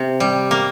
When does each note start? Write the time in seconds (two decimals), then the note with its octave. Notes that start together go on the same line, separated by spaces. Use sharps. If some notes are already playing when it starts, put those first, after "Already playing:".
Already playing: C3
0.20 G3
0.51 A#3